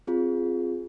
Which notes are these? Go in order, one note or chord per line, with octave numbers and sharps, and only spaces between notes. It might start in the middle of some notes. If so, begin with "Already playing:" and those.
C4 F4 G#4